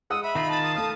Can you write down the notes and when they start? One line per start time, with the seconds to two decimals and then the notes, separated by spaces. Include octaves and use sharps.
0.10 G#3 F#5 D#6 E6
0.23 E5 B5
0.35 D#3 D#4 F4
0.49 A5
0.63 D#6
0.75 A3 F5 D#6 F6